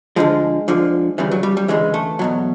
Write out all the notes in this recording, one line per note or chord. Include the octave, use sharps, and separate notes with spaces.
D2 D3 F3 G#3
D2 D3 F3
D2 C#3 E3 G3
F#3
G3
G3
D2 C#3 E3 G#3
A3
E2 B2 F#3